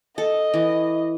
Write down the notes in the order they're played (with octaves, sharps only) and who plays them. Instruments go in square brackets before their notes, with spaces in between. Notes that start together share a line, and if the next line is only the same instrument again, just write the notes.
[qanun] A4 [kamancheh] D#5
[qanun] E3